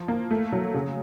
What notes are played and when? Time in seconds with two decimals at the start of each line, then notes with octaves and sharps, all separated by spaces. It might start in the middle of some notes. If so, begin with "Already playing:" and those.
Already playing: F3
0.08 A#3
0.31 A3
0.52 F#3
0.74 C#3